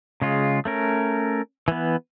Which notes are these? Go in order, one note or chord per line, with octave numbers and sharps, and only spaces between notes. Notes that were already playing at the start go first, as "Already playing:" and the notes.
C#3 G#3 F4
A3 C#4 A#4
E3 B3